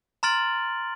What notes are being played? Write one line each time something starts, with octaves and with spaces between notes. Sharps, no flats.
A#5 C6 F6 A6 D7 F#7